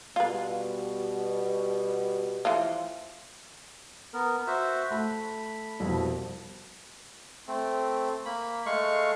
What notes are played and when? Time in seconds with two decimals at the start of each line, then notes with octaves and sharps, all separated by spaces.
0.16 B2 G3 F4 B4
2.45 E3 F3 F4
4.14 B3 A#4
4.47 F#4 C5 E5
4.91 A3 B5
5.80 C2 F2 B2
7.48 A3 C4
8.25 A#3 B5
8.66 G#3 A3 F5 C#6